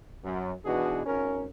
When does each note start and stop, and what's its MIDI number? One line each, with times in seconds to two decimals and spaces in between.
0.24 0.52 42
0.65 1.01 47
0.65 1.01 52
0.65 1.01 62
0.65 1.01 63
0.65 1.01 66
0.65 1.01 68
1.05 1.45 32
1.05 1.45 61
1.05 1.45 70